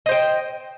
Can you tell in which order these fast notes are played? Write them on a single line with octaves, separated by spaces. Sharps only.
D#5 C5 G5